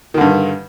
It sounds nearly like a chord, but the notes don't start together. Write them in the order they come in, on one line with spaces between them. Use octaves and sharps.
D#3 D3 G2